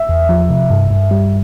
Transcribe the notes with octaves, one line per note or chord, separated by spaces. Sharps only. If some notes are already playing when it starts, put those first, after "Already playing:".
Already playing: E5
E2
F3
C3
G2
G2
G3